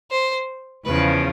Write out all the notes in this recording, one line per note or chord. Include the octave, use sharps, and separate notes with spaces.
C5
E2 C#3 F3 B4